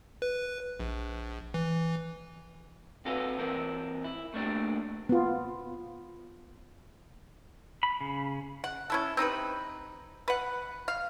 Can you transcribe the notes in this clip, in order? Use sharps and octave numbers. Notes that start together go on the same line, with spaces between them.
B4
A#1
E3
C3 F#4 A4 B4 F5
E3 C4 A#4
E4
A3 A#3 D4 G4
B3 F4
B5
C#3
F#5
C#4 E4 A4
C4 D#4 G4 B4
B4 F#5
F5